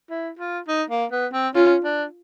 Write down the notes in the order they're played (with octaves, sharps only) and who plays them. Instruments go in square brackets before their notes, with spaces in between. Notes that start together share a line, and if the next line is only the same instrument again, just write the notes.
[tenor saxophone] E4
F4
D#4
A#3
B3
C4
[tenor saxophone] C#4 [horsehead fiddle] F4
[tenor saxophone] D4